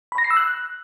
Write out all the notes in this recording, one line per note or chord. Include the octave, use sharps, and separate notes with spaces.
B5
A#6
C7
E6
F#6